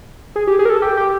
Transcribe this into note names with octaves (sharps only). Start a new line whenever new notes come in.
G#4
G4
G#4
A#4
A4
G4
G4